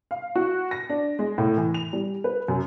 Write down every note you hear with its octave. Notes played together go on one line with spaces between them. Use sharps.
F5
F#4
A#6
D4
G#3
A2
E3
F7
G3
B4
F#2